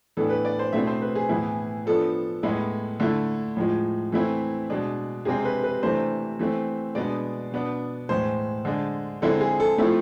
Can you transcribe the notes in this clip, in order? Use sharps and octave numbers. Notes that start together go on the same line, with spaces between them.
A2 E3 B3 D4 A4
B4
D5
C5
B2 A3 C4 E4 E5
C5
B4
G#4
A2 E3 B3 E4
F3 B3 D4 A4
A2 G#3 B3 E4
D3 A3 E4
A2 F3 G#3
E3 A3 C4 E4
B2 G#3 D4
C3 G#3 C4 G#4
B4
B4
C3 E3 A3 D4 C5
E3 A3 C4
B2 G#3 B3 D4 D5
B2 B3 D4
A2 E3 G#3 C5
D3 G#3 D4
D3 G#3 C4 E4 A4
G#4
A4
F3 A3 C4 E4